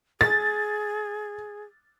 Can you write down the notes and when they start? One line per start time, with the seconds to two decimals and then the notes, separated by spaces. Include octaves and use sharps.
0.21 G#4 A6